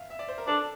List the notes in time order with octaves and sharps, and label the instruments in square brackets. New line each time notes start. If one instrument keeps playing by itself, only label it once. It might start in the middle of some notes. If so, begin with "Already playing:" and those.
Already playing: [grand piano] E5 F5
E5
D5
C5
A#4
[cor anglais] D4 [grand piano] A4